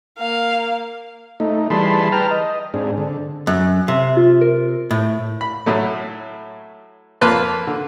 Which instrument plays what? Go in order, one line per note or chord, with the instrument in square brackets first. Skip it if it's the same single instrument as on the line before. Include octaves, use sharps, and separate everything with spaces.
[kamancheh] A#3 F5
[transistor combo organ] A3 D#4
E3 G3 G#4 A5 B5 C6
B4 G5 A5 A#5 F6
D#5
G#2 C4 D4 G#4
D3
[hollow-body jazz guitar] F#2 [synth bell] F#6
[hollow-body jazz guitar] C3 [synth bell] E5
[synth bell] F4
A#4
[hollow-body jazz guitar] A2
[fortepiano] B5
A2 F#3 A3
F2 A#3 F4 B4 A5 C6
D3